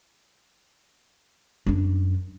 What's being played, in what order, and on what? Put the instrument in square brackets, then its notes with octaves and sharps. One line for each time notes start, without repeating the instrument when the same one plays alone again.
[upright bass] F#2 D4